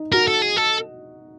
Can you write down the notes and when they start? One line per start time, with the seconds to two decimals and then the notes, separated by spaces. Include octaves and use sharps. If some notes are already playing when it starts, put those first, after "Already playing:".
Already playing: D#4
0.12 F#4 A#4
0.28 A4
0.42 G#4
0.56 A4